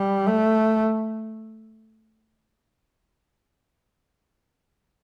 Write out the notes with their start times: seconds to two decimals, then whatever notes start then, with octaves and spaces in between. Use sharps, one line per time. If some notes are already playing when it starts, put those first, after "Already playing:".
Already playing: G3
0.27 A3